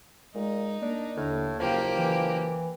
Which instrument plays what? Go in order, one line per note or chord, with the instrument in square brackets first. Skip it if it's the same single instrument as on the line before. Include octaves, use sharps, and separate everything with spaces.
[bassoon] A#2 [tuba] G#3 [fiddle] D#4
[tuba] A#3 [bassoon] D4
[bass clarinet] D#2 [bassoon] A2 [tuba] D3
[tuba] F#1 [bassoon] F3 [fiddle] A#3 G4
[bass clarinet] E3